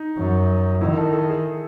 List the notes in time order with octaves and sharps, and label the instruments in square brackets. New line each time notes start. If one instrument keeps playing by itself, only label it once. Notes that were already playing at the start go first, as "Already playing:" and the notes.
Already playing: [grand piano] D#4
[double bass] F#2
[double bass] D#3 [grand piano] E4
[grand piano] A4
A4
G#4